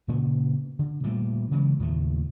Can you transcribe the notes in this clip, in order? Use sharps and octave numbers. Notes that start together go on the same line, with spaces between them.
A#2 C#3 A#3 B3
D3
A#2 G3 A3 A#3
C#3 E3 F#3 G#3
D#2 A2 C#3 A3